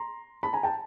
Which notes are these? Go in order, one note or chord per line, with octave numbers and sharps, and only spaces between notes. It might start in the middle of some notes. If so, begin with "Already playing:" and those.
Already playing: A#5 C6
A5 B5
G#5 A#5
G5 A5